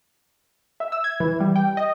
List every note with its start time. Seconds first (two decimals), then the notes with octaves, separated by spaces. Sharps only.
0.80 E5
0.92 E6
1.04 G#6
1.20 E3
1.40 G3
1.56 G5
1.77 D#5